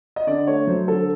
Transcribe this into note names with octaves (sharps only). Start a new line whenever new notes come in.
D#5
D3 D5
A3 C#5
F#3 C5
D3 A4